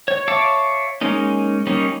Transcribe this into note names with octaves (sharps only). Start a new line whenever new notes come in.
C#5
C#5 E5 F5 A5 D6
G#3 A#3 C#4 D#4
G3 A#3 C#4 D#4